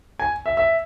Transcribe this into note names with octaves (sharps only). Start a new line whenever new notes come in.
G#5
E5
E5